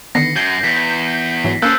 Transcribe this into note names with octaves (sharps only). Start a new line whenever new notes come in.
D3 D#3 B3 A#6 C7 C#7
F#2 G6
E2 A#6 B6
G#2 E3 F#3
A#3 C#4 A4 C5 E6 F#6 G6